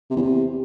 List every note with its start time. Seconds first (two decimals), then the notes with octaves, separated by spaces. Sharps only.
0.10 C3
0.16 E2
0.22 C3